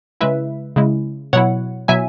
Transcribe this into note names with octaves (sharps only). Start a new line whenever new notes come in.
C#3 G#3 E4 B4 E5
C#3 G#3 E4
B2 F#3 E4 C#5 F#5
B2 F#3 E4 E5 G#5